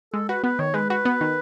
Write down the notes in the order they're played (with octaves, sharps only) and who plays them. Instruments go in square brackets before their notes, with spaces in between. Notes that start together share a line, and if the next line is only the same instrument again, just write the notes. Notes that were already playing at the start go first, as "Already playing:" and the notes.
[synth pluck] G#3 [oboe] A4
[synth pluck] F#4 [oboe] B4
[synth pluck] B3 [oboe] B4
[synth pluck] D#3 [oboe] C#5
[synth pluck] G#3 [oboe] B4
[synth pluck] F#4 [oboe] B4
[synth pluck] B3
D#3